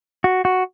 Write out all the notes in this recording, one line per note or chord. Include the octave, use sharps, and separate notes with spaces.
F#4
F#4